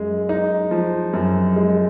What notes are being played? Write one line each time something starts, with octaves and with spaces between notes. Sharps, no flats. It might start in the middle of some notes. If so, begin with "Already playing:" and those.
Already playing: F#2 G#3
D#4
F3
F#2
G#3